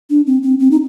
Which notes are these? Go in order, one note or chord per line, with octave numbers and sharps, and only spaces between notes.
D4
C4
C4
C4
D#4